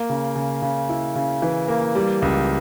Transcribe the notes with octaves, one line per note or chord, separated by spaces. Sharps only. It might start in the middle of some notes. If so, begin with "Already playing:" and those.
Already playing: A#3
C#3
C#3
C#3
E4
C#3
E3
A#3
G3
C#2